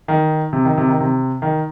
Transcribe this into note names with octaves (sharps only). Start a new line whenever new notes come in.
D#3
C3
D#3
C3
D#3
C3
D#3